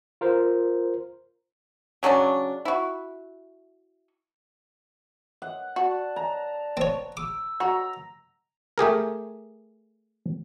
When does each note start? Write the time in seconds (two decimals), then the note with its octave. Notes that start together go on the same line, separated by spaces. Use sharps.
0.21 F4 A#4 C5
2.03 C#3 F#3 C#4 D4
2.65 E4 F#4
5.42 F#5
5.76 F#4 D5 A5
6.16 A#5
6.77 C4 C#5
7.17 D6 E6
7.60 F#4 A#5
8.78 A3 G4 G#4 A#4